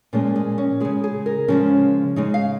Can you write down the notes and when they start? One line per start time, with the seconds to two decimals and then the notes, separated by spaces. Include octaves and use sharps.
0.13 A#2 F3 G#3 C#4
0.36 G#3
0.58 C#4
0.80 C#3 G#3 G#4
1.04 G#4
1.26 A#4
1.48 C#3 F3 G#3 C#4
2.16 C#3 G#3 D#4
2.34 F5